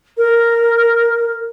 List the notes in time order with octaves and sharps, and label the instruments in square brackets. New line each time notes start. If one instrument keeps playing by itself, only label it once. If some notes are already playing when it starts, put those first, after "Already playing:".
[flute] A#4